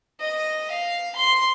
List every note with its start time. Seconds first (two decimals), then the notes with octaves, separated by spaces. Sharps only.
0.20 D#5
0.71 F5
1.16 C6